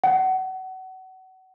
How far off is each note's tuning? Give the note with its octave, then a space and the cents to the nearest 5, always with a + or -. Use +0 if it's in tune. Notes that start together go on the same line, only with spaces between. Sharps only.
F#5 +30